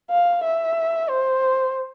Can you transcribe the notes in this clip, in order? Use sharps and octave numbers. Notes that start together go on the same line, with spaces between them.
F5
E5
C5